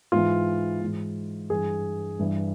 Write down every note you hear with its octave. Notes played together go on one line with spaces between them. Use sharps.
G#2 E3 F4
G#2 E3
G2 E3 G#4
G2 E3